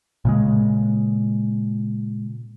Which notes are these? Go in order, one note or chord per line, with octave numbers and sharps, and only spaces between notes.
A#2 C#3 G#3